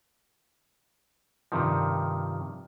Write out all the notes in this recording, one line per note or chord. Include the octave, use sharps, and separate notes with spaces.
G2 C3 D#3 F3